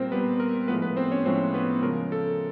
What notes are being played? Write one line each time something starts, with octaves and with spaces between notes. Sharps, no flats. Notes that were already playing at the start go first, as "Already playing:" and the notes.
Already playing: A#2 G3 C4 A#4 C5
A#2 G3 B3 B4
A#4
A2 F3 G#3 B3 B4
B3 B4
C4 C5
C#4 C#5
A2 F3 G#3 C4 C5
B3 B4
C#3 F3 G#3 A#4
A4